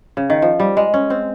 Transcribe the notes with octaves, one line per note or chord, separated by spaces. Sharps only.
C#3
D#3
F3
G3
G#3
C#4
C4